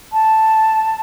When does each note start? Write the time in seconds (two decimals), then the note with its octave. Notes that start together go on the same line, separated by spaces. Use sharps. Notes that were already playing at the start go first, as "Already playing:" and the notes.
0.13 A5